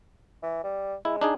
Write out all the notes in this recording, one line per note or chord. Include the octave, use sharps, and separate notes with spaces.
E3
G3
G#3 E4
D4 D#4 G#4